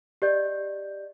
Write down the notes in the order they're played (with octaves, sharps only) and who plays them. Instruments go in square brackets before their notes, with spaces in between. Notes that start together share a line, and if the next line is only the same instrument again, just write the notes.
[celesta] G4 D5 D#5 G6